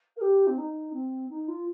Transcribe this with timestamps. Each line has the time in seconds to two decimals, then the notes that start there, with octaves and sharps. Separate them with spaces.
0.16 A#4
0.21 G4
0.47 C4
0.57 D#4
0.93 C4
1.29 D#4
1.48 F4